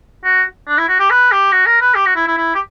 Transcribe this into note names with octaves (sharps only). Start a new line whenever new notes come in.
F#4
D4
E4
F#4
G4
B4
G4
F#4
A#4
B4
G4
F#4
E4
E4
E4
G4